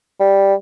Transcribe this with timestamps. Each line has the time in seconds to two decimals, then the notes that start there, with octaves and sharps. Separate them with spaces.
0.20 G3